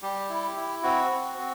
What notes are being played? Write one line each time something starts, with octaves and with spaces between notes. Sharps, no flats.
G3 G4
E4
E4
C4 F#4
C4
C4